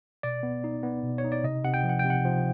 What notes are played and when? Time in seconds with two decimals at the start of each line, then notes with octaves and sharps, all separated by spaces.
0.23 B2 D5
0.43 B3
0.64 D#4
0.83 B3
1.03 B2
1.18 C#5
1.24 D#4
1.32 D5
1.44 C3 D#5
1.65 C3 F#5
1.74 G5
1.83 F3
1.89 F#5
1.99 G5
2.05 C3
2.10 F#5
2.25 F3